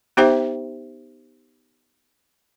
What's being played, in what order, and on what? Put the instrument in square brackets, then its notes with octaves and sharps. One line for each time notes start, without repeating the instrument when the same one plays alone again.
[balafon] B3 D#4 G4 C5 E5 G5